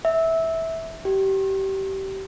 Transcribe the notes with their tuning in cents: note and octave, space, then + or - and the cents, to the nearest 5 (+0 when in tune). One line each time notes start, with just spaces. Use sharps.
E5 -15
G4 -25